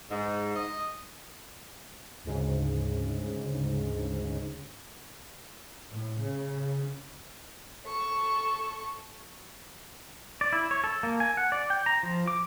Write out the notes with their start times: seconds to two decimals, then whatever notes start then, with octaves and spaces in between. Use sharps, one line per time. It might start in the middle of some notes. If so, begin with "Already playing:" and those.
0.10 G#2
0.56 D#5
2.24 D2 G#2 C#3
5.91 A2
6.21 C#3
7.87 A4 C#6
10.41 D5
10.53 E4
10.71 C#5
10.84 A4
11.03 A#3
11.20 G#5
11.37 F#5
11.52 D5
11.70 G5
11.86 A#5
12.03 F3
12.27 D6